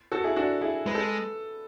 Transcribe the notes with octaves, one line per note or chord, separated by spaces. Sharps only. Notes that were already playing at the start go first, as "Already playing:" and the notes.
F#4 A4
E4 G#4
D4 F#4
E4 G#4
G#3 B4
A4